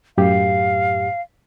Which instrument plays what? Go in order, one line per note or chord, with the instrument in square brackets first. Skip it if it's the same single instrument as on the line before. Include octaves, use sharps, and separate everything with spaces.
[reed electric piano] F#2 A2 G4 [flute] F5